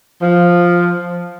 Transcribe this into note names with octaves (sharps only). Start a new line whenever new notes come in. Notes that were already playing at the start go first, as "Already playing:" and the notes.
F3